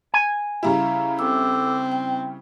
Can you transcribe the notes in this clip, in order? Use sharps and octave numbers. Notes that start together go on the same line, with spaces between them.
G#5
C#3 G3 E4 F5 A#5
C4 A4 D6 E6
G5